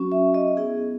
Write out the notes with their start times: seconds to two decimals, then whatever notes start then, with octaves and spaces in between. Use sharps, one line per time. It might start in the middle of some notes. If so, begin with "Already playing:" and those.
Already playing: F#3 C#4 F#4
0.12 E5
0.34 D#5
0.57 B3 E4 G#4